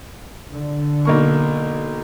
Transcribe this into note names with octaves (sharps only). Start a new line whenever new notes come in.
D3
B1 A#3 C#6